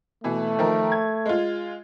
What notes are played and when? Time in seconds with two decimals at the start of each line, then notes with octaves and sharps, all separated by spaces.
0.24 B2 E3 A3
0.59 D#3 F3 A#4
0.92 G#6
1.26 G#3 F4